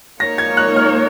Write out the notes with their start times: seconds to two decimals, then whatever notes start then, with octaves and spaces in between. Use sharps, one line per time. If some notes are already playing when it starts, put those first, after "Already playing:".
0.20 A#3 D#4 A#4 C#5 A#6
0.38 G#6
0.57 F#6
0.76 F6